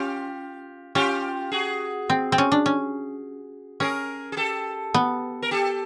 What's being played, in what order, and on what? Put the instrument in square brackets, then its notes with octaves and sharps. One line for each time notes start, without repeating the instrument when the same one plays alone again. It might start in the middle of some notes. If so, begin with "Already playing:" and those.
Already playing: [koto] C#4 [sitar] F4 G4
[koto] C#4 [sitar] F4 G4
[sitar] F#4 G#4
[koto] C4
C4
C#4
D4
C#4
[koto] C#4 [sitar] G#4 A#4
[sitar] G#4
G4 A4
[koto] B3
[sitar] A#4
G4 A4